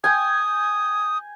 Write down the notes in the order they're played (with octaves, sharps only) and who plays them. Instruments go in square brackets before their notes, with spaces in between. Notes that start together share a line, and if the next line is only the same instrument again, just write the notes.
[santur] G5 G#5 [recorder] D#6